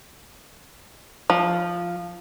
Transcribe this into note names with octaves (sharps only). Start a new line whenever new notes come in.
F3